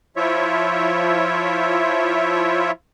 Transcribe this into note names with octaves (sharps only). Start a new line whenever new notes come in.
F3 E4 F4 C#5 E5